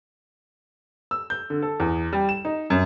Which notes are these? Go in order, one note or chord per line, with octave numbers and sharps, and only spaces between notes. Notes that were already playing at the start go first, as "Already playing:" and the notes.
E6
G6
D3
A4
E2
G3
E7
D#4
F#2